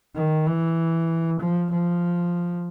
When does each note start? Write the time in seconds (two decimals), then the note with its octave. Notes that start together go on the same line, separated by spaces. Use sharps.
0.15 D#3
0.46 E3
1.40 F3
1.71 F3